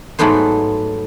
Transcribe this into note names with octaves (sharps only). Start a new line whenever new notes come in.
G#2 F#3 A3 B3 C5